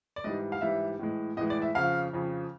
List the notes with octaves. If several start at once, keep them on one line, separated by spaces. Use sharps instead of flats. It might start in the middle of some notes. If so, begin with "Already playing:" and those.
D5
G#2 E3 G3 D#5
F5
G#2 E3 G3 E5
A2 E3 G#3
A2 E3 G#3 D#5
D5
E5
F2 C#3 F3 F5
F2 C#3 F3